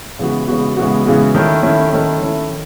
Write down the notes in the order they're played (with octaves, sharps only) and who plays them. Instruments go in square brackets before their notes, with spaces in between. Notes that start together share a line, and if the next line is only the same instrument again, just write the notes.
[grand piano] C#3 E3 G#3 B3 F#4
C#3 E3 G#3 B3 F#4
C#3 E3 G#3 B3 F#4
C#3 E3 G#3 B3 F#4
D#3 A3 C#4 E4
D#3 A3 C#4 E4
D#3 A3 C#4 E4
D#3 A3 C#4 E4
D#3